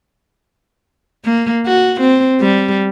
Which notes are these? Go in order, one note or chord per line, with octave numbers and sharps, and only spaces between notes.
A#3
F#4
C4
G3